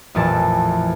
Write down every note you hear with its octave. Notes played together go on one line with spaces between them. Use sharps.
A1 F2 A#2 E3 A5